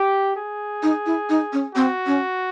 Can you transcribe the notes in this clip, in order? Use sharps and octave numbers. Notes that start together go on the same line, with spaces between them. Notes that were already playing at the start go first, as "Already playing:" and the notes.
Already playing: G4
G#4
D#4
E4
D#4
C#4
C4 F#4
C#4